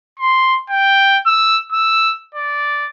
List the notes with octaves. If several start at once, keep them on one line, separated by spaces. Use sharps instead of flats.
C6
G5
E6
E6
D5